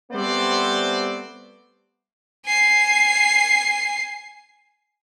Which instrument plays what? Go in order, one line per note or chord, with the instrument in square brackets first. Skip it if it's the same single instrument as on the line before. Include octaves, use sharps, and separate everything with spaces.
[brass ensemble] G3 A3 B3 C4 C5 D5
[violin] G#5 C7